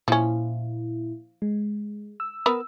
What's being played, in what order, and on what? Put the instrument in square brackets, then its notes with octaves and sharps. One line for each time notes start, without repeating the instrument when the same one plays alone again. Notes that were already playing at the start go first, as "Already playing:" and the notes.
[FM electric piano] A#2 E4 [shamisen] F3 C#4
[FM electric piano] G#3
E6
[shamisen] B3 A#4 B4 [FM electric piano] E6